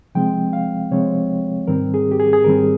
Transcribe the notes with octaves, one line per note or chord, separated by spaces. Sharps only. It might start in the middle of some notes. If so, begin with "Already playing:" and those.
C3 F3 G#3 C4 G5
F5
C3 F3 G#3 C4 C#5
G#2 D#3 G3 C4 A#4
G#4
G4
G#4
G#4
G#2 D#3 G3 C4 A#4